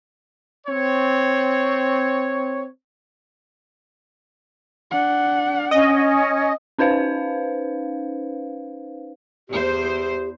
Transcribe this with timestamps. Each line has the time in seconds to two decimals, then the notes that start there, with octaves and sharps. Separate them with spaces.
0.67 C4 C#5
4.91 D4 F#5
5.71 C#4 D#5
6.79 C#4 D#4 B4 C5 F5
9.49 E2 G4 C5